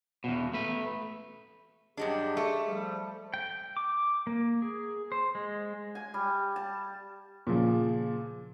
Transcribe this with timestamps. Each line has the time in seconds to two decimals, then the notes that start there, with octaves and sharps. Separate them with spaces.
0.24 E2 B2
0.54 A3 B4
1.97 G2 F#3 G#3 D4 G4 G#4
2.37 A3
2.67 F3 G3
3.34 G5
3.77 D6
4.27 A#3
4.62 G#4
5.12 C5
5.35 G#3
5.95 G#5
6.14 G3
6.56 A5
7.47 A#2 C#3 F3